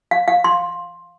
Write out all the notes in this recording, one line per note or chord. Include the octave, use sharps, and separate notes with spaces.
F5
F5
C6